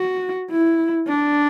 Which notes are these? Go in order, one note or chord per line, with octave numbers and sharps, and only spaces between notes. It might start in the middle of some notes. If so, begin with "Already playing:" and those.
Already playing: F#4
E4
D4